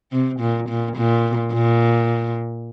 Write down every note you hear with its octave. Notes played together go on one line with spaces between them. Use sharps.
C3
A#2
A#2
A#2
A#2